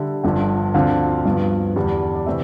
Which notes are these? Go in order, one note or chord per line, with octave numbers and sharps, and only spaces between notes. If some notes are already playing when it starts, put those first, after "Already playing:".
Already playing: D3 G3 E5
G1 G2 D3 F3
D2 D3 F3 C4 F4 F5
G2 F3 B3
E2 D3 G3 D4
D5
C3 E3 A3 C4 E5